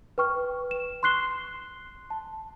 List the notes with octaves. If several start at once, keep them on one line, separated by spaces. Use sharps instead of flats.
B4 G5 C#6 F6
E7
C6 C#6 F#6 C7 G7
A5